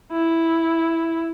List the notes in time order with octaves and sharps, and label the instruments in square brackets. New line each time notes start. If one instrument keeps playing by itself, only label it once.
[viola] E4